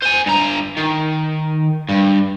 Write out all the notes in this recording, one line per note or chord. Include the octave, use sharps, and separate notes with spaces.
C5 G#5
G2 A#5
D#3
G2